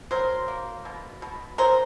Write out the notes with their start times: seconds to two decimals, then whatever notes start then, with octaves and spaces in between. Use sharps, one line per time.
0.11 F#3 A#4 C5
0.48 A#3
0.85 B2
1.22 B2
1.58 F#3 A#4 C5